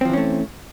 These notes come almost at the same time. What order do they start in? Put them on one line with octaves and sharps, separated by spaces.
C4 F3 E3 C#4 A3